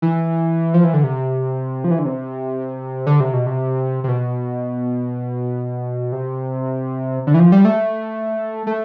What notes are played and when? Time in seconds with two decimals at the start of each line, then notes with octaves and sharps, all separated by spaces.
0.02 E3
0.74 F3
0.84 E3
0.94 D3
1.04 C3
1.84 F3
1.91 E3
1.99 D3
2.05 C3
3.07 D3
3.20 C3
3.34 B2
3.46 C3
4.04 C3
4.09 B2
6.12 C3
7.27 D3
7.34 E3
7.40 F3
7.52 G3
7.65 A3
8.67 A3